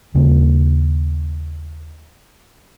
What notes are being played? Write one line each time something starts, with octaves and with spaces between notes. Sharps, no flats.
D#2 C#3 A#3